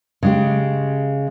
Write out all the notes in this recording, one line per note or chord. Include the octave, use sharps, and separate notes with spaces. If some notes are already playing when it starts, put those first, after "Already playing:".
C#3 G#3 G4